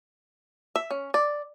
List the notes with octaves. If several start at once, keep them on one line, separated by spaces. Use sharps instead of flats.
E5
C#4
D5